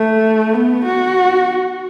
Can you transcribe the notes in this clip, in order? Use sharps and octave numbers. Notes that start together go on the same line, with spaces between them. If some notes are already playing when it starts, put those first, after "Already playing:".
Already playing: A3
B3
F#4